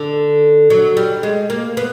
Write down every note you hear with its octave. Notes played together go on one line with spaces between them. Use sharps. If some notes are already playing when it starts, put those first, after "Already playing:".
Already playing: D3
F#3
G3
G#3
A#3
B3